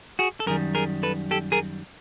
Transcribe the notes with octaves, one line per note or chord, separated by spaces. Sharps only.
F#4 G#4
A4
F#2 D#3 G3 G#4 A#4
G#4 A#4
A4 B4
G4 A4
G#4 A#4